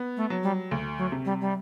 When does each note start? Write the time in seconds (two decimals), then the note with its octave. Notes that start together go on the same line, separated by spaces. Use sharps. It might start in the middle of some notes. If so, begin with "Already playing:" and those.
Already playing: B3
0.17 A3
0.30 F#3
0.43 G3
0.71 D2
0.98 F#3
1.12 C3
1.25 G3
1.41 G3